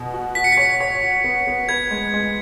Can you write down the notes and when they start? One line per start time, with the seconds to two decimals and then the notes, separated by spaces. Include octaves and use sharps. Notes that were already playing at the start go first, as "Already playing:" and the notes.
Already playing: B2
0.14 F#4
0.35 F#4 B6
0.44 C#7
0.52 B6
0.57 C#5
0.80 C#5
1.03 F#4
1.24 B3
1.47 B3
1.69 B4 G#6
1.91 G#3
2.14 G#3